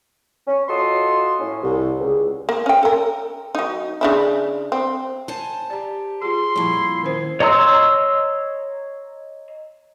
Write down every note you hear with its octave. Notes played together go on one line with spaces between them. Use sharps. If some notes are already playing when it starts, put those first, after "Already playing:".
C#4
F4 F#4 A4 D#5 C6
A2 C#4
C2
C#2
A#3
C#4 G5
A4 A#4
F#3 D#4
C#3 D4 E4
C4
C5 G#5 A5
G4 D5 A#5
F4 G#4 C6
F2 A#2 F3 G3 E4 A5
D#3 C#4 C5
C#5 D#5 A#5 C6 E6